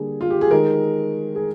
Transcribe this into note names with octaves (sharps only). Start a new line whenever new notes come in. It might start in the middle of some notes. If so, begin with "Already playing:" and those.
Already playing: D3 G3 A#3 G#4
F4
G4
G#4
D#3 G#3 A#4
G#4